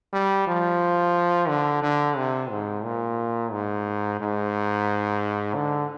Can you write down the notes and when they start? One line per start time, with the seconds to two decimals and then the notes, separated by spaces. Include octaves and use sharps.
0.13 G3
0.47 F3
1.48 D3
1.82 D3
2.17 C3
2.51 G#2
2.84 A#2
3.52 G#2
4.21 G#2
5.55 D3